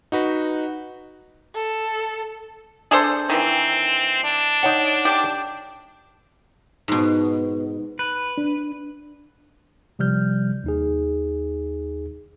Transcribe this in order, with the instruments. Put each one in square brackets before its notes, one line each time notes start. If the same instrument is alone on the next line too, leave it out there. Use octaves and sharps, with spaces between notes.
[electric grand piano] D#4 F#4 B4
[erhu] A4
[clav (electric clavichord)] D4 [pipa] G#4 A4 C5
[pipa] D#3 E3 [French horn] C4
[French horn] D4
[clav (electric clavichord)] D#4 C#5 F#5
[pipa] G4
[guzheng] G#2 B2
[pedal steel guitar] B4
[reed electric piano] D4
[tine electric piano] C3 F3 G3 F6 G6
D#2 D#4 G#4